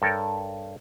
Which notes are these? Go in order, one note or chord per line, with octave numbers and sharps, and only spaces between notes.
G2 A4 A#4 C#5 G5